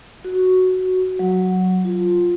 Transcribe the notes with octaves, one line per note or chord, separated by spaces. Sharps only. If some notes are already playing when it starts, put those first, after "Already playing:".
F#4
F#3
F4